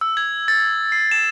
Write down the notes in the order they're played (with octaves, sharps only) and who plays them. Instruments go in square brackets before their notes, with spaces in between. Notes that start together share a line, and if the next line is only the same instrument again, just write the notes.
[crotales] E6
G#6
A6
C7
E7